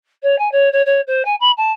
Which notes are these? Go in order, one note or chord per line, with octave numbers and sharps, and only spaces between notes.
C#5
G#5
C#5
C#5
C#5
C5
G#5
B5
A5